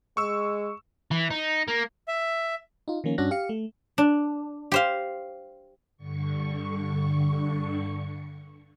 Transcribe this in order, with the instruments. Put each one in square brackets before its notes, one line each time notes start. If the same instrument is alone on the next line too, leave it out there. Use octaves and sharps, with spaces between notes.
[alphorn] G#3 [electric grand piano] C#6 E6
[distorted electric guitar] E3
D#4
A#3
[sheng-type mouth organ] E5
[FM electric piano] D#4 F4
D#3 F3 A#3 C#4
G2 C#4 D4 F#4 F#6 A#6
G4 F5 C#7
A3
[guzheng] D4
G4 C5 F5
[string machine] G2 D3 C#6